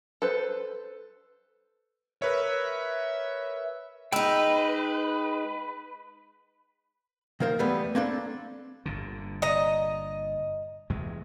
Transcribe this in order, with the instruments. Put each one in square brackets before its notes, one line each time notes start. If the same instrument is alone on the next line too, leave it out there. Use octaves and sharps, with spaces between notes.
[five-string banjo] A4 B4 C5
[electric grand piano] A#4 B4 C#5 [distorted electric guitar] E5
[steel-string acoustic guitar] G#3 D#4 [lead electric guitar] B4 [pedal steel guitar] G5 E6
[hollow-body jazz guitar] D#3 A#3 A#4 C5
E2 G3 A3 B3
A#3 C4 D4 A4
[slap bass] G1 A#2 D3
[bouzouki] D#5 A#5
[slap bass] E2 C3 G#3